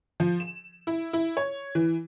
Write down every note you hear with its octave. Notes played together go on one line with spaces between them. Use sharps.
F3
E7
E4
E4
C#5
E3